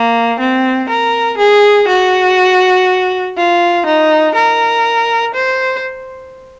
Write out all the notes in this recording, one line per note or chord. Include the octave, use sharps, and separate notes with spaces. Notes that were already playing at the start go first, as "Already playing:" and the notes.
Already playing: A#3
C4
A#4
G#4
F#4
F4
D#4
A#4
C5